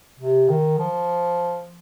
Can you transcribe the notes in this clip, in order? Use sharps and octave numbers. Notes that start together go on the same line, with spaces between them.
C3
D#3
F3